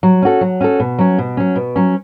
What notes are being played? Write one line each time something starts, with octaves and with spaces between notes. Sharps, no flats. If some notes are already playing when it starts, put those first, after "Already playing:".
F#3
C#4 F#4 A4
F#3
C#4 F#4 A4
B2
F#3 C#4
B2
F#3 C#4
B2
F#3 C#4